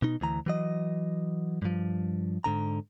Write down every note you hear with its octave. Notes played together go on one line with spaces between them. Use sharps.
B2 D#4
D2 E3 A#5
E3 F#3 D#5
G2 F3
G#2 D3 A#5